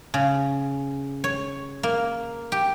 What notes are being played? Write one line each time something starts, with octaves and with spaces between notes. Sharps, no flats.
C#3
C#5
A#3
G4